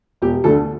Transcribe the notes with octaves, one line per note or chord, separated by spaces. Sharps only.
E1 G4
D2 D3 A4